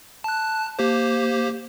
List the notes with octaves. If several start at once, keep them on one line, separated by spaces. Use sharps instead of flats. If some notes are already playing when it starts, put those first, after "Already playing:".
A5 F#6
A#3 G4 C5